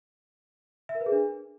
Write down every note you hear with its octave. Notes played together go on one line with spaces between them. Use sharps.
E5
A#4
B4
G#4
D4